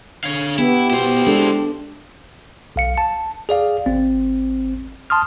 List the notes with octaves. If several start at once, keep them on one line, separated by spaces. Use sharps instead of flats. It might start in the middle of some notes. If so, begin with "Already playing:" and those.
D3 C#5 F5
B3 E4 G4
B2 E4 C5
G#3 D4 A4
B1 F5 C#7
A5
G#4 D5 F5
G#1 C4
A5 C6 D#6 F6